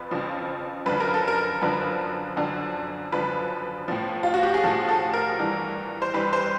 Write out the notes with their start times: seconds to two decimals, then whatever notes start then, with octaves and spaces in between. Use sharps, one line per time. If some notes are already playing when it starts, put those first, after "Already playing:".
Already playing: F2 F3 B4
0.11 F2 C#3 F3
0.86 F#2 D3 F3 B4
1.00 A#4
1.14 A4
1.28 A#4
1.62 F#2 D3 F3 B4
2.37 F#2 D3 F3
3.12 F#2 D3 F3 B4
3.88 A2 F3
4.23 F4
4.34 F#4
4.43 G4
4.54 G#4
4.63 A2 F3 A4
4.89 A4
5.13 A#4
5.39 G2 E3
6.02 C5
6.14 G2 E3 B4
6.33 C5